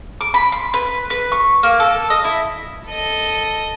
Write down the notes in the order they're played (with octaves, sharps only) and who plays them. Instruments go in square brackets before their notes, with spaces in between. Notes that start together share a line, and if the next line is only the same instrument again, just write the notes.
[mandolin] D6
B5
C6
B4
B4
C#6
A#3
A4
D#5
E4
[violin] A4 D#5